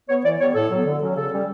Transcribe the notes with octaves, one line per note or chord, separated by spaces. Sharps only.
B3 C#5
E3 D5
G3 B3 C#5
A2 A4
F#3 B3
D3
F#3 C#4
C#3 A4
G3 C#4